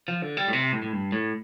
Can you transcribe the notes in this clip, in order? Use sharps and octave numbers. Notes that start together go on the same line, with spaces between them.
F3
D3
G3
A2
C3
A2
A2
G2
A2